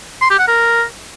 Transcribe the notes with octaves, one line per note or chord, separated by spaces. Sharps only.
C6
G4
F#5
A#4